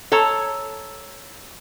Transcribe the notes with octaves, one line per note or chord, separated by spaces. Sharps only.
A4 C#5 A#5